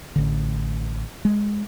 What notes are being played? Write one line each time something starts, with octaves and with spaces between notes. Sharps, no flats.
A1 D3
G#3